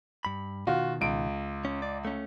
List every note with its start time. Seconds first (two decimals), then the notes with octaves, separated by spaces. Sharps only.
0.25 G2 B5
0.67 B2 D#3 F4 F#4
1.01 C#2 D7
1.65 C#4
1.82 D5
2.05 A3 C#4